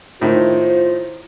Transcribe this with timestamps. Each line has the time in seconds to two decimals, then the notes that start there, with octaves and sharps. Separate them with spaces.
0.21 A2 D#3 F4 C5